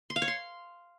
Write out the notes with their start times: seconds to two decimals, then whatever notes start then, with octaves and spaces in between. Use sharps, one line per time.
0.10 C6
0.16 F5
0.22 C#5
0.28 C6